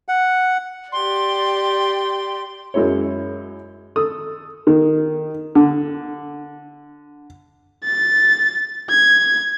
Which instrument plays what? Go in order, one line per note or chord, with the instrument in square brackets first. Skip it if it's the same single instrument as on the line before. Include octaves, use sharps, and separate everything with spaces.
[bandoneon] F#5
[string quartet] G4 D5 [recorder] C6
[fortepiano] F#2 G#3 E4 C#5
A4 D#6
D#3
D3
[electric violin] A6
G#6